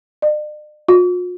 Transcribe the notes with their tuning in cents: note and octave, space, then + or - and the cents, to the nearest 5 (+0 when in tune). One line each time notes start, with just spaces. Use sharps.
D5 +45
F4 +45